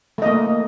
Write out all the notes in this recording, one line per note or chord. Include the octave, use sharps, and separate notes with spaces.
A3 A#3 D#5